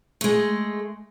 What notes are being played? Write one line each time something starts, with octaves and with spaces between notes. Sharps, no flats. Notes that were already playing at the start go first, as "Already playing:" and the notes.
G#3 A3